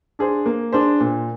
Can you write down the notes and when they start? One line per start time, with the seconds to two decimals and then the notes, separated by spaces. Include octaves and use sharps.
0.19 D4 G#4 C5
0.46 A#3
0.73 D4 G#4 C5
1.00 A#2